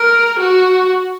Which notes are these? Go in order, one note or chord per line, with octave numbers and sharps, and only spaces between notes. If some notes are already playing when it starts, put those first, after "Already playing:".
Already playing: A#4
F#4